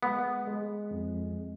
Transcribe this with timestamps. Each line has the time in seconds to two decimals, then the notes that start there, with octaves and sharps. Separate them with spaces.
0.03 G#3 B3
0.47 G#3
0.91 F2